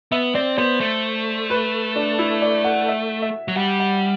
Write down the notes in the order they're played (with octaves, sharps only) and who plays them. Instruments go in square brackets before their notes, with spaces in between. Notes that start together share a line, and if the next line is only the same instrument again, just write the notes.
[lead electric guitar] B3 [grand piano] E5
[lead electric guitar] C4 [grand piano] D5
[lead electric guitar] B3 [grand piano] C5
[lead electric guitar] A3
[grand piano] B4
D4
E4
D5
F#5
E5
E5
[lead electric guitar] F#3
[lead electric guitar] G3 [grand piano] F#5
[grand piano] F#5